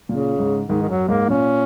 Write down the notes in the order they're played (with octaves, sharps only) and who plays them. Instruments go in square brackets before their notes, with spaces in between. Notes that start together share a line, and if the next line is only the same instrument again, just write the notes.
[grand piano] A#2 [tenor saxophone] C#3
[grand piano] G#2
[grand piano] G#2 [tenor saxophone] D#3
[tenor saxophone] D#3
[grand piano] F#2 [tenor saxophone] F#3
[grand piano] G#2 [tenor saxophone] A#3
[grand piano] A#2 [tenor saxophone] C#4